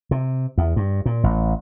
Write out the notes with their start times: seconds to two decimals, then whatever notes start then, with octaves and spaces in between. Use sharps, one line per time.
0.11 C3
0.58 E2
0.76 G2
1.06 A#2
1.24 A1